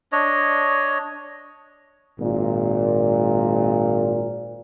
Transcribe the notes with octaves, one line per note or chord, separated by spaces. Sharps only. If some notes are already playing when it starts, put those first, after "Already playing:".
D4 C#5 D#5
G#1 A#2